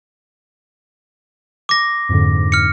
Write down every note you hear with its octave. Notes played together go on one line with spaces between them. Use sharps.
D6 A#6
F2 G#2 D3
F6 C#7